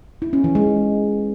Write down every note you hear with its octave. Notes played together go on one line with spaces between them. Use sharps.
E4
C#4
E3
G#3